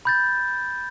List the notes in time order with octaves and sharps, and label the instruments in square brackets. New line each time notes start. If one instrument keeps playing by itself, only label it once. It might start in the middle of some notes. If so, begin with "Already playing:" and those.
[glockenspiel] B5 G6 A6